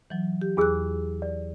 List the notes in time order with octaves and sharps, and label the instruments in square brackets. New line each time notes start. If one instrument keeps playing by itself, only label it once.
[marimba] E3 F#3
G4
[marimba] E2 F#6 [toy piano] F4 G#4 E6
[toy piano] D5